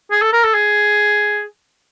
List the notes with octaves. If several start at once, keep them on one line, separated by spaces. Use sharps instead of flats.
G#4
A4
A#4
A4
G#4